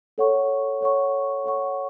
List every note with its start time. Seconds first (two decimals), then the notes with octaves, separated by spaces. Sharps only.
0.18 A4 C#5 F#5 C#6
0.81 A4 C#5 F#5 C#6
1.44 A4 C#5 F#5 C#6